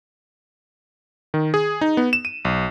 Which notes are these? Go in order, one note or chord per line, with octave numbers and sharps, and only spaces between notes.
D#3
G#4
D#4
B3
E7
D#7
B1